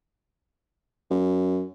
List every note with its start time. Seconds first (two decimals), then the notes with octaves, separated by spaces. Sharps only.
1.10 F#2